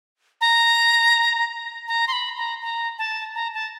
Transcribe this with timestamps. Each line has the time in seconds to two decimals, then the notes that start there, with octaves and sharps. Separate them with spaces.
0.41 A#5
1.88 A#5
2.08 C6
2.13 B5
2.37 A#5
2.62 A#5
2.98 A5
3.35 A#5
3.54 A5